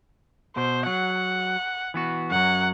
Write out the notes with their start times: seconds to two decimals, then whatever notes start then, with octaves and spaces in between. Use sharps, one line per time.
0.57 B2 C5
0.86 F#3 F#5
1.94 E3 B3 F#4
2.31 F#2 F#3 F#5